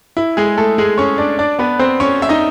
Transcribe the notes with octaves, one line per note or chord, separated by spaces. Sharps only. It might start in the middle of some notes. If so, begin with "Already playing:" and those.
E4
G#3 G#4
A3 A4
G#3 G#4
C#4 C#5
D4 D5
D4 D5
B3 B4
C4 C5
C#4 C#5
E5
D#4 D#5